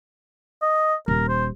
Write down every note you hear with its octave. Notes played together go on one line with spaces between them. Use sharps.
D#5
D#1 A#4
C5